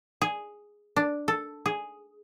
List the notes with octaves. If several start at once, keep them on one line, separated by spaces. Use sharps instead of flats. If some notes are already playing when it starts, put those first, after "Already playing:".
G#4
D4
A4
G#4